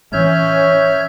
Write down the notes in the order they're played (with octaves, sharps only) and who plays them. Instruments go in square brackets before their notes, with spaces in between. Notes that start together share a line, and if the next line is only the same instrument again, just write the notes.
[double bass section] E3 C#4 [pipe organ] C#5 G6 [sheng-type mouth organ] E5 F6